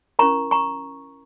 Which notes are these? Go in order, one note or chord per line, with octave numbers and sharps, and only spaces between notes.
C#4 E4 A#4 A#5 C#6
A#5 C#6